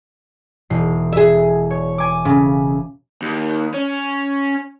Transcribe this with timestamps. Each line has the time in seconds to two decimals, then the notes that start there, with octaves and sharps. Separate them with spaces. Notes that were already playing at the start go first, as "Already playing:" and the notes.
0.70 E1 C7
1.13 G#4 E5
1.71 C#5
1.98 G#5 D6
2.25 C#3
3.22 D#2
3.74 C#4